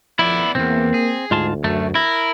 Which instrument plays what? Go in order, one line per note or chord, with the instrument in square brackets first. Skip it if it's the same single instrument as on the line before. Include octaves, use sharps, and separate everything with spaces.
[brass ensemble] F2 [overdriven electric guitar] B3 D5 [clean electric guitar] E4
[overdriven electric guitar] B1 E2 [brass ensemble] A#3 [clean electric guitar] C4
[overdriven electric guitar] G#4
[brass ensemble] D2 [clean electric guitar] G#2 F4 A5
[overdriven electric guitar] F#2 [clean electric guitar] A3
[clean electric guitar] E4 [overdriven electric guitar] A#4